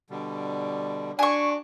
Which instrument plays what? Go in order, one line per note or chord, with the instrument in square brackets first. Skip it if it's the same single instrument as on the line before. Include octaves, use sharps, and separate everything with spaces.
[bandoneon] B2 D3 G3
[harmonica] D4 [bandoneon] F#4 [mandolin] G#5 C#6